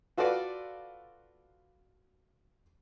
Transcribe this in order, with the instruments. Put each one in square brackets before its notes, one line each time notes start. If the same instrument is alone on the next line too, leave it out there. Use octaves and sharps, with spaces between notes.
[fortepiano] F4 F#4 A4 B4 D5 F5